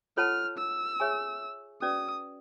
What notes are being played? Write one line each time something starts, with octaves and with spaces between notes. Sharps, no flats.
F4 A4 C#5 F#5 A5 F6
E6
G#4 C#5 E5 G#5 C#6
C#4 F#4 B4 D5 D#6